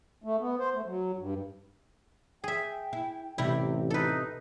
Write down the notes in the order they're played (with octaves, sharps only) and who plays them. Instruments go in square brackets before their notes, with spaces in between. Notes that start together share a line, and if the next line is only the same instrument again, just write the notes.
[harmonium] A3
B3
C5
A3
F#3
G2
[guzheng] G#4 E5 [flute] G5
[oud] E4
[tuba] A1 [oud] C3 G3 G4 [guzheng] E4
[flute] D#4 [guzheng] A4 B4